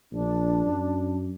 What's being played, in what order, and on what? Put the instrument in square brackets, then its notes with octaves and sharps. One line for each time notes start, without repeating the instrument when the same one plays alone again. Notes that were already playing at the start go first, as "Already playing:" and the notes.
[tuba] A#1 [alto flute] D4
[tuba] F#2